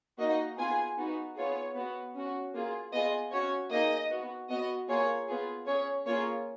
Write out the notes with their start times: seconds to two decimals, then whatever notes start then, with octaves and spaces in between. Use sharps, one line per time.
0.19 A#3 D#4 F#4 D#5
0.58 B3 F4 G#4 G#5
0.96 B3 D#4 F#4
1.36 B3 F4 G#4 C#5
1.75 B3 F#4
2.14 C#4 F#4
2.54 A#3 F4 G#4
2.93 B3 F4 G#4 D#5
3.31 C#4 F#4 C#5
3.71 A#3 D#4 G#4 D#5
4.10 B3 F#4
4.50 B3 F#4 D#5
4.88 A#3 F4 G#4 C#5
5.27 B3 F4 G#4
5.66 C#4 G#4 C#5
6.06 A#3 F4 G#4 C#5